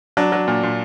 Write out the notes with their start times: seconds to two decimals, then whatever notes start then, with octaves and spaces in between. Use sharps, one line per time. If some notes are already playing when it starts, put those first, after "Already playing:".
0.17 F#3 D4
0.32 F#3
0.48 A#2
0.63 A#2